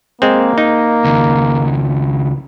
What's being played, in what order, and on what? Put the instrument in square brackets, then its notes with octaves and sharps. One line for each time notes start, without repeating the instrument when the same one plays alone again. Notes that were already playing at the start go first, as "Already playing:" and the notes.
[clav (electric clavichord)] G#3 C4 [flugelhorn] A#3
[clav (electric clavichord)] D#4
[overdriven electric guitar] C#2 D#3